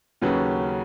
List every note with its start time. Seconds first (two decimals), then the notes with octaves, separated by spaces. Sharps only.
0.22 D#2 C#3 F#3 C#4 B4